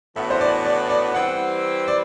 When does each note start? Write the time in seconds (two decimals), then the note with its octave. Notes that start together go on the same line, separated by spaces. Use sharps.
0.16 A2 E3 B3 D4 F#4 E5
0.30 C5
0.41 D5
0.65 D5
0.90 D5
1.14 E3 G3 C4 E4 F#5
1.88 D5